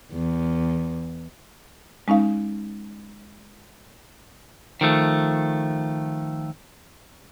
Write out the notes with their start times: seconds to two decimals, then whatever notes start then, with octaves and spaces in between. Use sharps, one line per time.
0.13 E2
2.08 G#3 C#4 D#4 F5
4.81 D#3 F3 A3